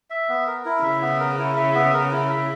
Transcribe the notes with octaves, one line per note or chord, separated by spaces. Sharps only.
E5
B3
A#4
E4
C#3 E5
B3
A#4
E4
E5
B3
A#4
E4
E5